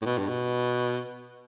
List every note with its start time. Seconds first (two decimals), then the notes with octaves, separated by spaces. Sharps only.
0.02 A2
0.06 B2
0.18 G2
0.29 B2